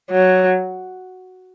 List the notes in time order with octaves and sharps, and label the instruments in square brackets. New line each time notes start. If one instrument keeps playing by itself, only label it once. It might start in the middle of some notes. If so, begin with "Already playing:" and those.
[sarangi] F#3